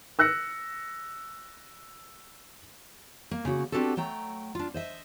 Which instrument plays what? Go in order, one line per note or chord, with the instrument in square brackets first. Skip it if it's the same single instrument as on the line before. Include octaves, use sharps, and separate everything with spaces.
[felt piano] E6 F#6 A#6 C#7
[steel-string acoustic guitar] A#3
C#3 A#3 F#4
B3 C4 D4 F#4 G4 A4
F#3 A3 G5 A#5
D4 F4
C5 D#5 E5